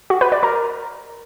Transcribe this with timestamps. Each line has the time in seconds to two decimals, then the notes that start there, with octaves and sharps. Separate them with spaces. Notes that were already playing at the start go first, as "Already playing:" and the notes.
0.10 F#4
0.21 B4
0.32 D5
0.43 A#4